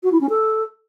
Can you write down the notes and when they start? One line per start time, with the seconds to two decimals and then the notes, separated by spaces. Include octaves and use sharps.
0.03 F#4
0.12 E4
0.21 C#4
0.29 A4